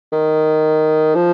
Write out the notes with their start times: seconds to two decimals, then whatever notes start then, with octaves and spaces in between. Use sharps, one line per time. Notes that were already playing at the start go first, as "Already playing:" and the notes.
0.12 D#3
1.15 F3